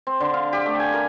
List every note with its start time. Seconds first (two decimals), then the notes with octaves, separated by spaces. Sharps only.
0.07 C4
0.20 D3
0.34 F5
0.53 G4
0.66 A3
0.80 G#5
0.94 A#4